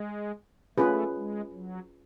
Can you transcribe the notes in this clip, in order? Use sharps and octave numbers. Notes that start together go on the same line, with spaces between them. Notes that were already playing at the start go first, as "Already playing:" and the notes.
Already playing: G#3
A3 C#4 F4 G#4 B4
G#3
F#3